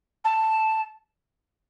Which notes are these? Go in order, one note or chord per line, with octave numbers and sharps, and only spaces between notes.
A5